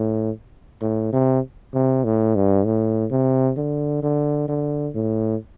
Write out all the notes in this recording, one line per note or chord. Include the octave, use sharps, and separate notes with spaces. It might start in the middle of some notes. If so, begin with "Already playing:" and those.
Already playing: A2
A2
C3
C3
A2
G2
A2
C3
D3
D3
D3
A2